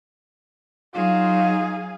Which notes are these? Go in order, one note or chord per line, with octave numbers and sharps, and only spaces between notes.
F#3 D#4 F4 G#4 F5